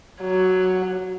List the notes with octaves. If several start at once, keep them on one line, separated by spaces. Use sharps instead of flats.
F#3